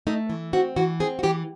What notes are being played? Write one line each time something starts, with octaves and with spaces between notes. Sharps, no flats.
A3 D#4
E3
C4 F#4
E3 F#4
C4 G#4
F#4
E3 G4